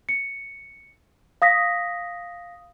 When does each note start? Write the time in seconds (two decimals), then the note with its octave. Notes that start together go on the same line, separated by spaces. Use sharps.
0.09 C#7
1.42 F5 D#6 A#6 B6